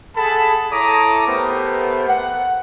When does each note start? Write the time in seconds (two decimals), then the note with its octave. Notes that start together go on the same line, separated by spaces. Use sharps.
0.17 G#4 A4 F#5 A5 B5
0.72 E4 A4 C#5 A#5 D6 D#6
1.27 A3 B3 G4 A#4 C5
2.09 F#5